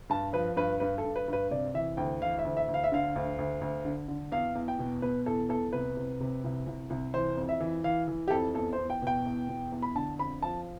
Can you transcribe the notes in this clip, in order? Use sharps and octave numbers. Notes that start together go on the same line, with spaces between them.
G2 A5
F3 B4
G2 B4
G2 B4
A4
G2
B4
G2 B4
C3 D5
E3 E5
D2 G5
E3 F5
E5
D2
E5
D2
F5
E5
D3 F5
D2
D2
D2
D3
D3
E2 F5
E2
G5
B2
B2 B4
E2 A4
E2 A4
C2 B4
C3
C3
C2
C2
C2
E3 C5
F2
E5
E3
E3 F5
E3
G4
F2 A4
E2 A4
E2 C5
G5
B2 G5
E2
B2
E2
B5
D3 A5
F2 B5
F3 A5